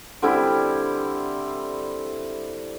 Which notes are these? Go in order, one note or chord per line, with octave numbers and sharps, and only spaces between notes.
D3 G3 C4 E4